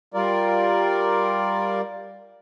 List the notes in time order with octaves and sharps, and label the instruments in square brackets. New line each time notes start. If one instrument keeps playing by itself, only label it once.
[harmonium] G3 F4 A#4 D5